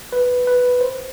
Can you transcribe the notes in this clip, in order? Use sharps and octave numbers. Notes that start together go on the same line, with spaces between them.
B4
B4
C5